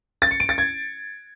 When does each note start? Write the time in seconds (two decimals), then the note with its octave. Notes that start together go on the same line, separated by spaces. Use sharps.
0.22 A6
0.31 C#7
0.40 D7
0.49 A6
0.58 G#6